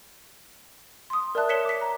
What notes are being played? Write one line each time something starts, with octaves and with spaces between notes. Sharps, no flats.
C6 D#6
A#4 D5 E5 A5 F#6
C#5 F#6 B6 C#7 E7 G7
D6 B6
A#5